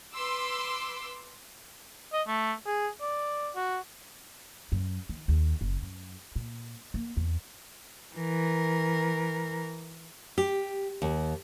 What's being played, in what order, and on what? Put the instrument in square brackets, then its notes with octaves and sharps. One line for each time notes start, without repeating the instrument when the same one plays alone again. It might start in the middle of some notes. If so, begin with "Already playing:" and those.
[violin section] B4 C6 D6 E6
[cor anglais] D#5
A3
G#4
D5
F#4
[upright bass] F#2
D#3
D#2
F#1
F#2
A#2
A#3
E2
[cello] E3 A#4
[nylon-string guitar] G4
D#2